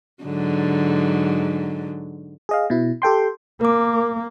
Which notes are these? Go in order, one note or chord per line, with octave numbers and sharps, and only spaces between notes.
G#2 D3 F#3
G#4 D#5 F5
B2 E4
G4 A4 G5 C6
A#3 A#4 D6